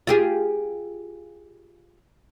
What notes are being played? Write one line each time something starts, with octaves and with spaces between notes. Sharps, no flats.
F4 G4 G#4